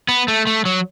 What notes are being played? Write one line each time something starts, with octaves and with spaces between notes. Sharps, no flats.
B3
A3
A3
F#3